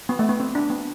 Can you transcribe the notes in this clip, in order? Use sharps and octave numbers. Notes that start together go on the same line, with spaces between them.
B3
A3
B3
C4
D4
B3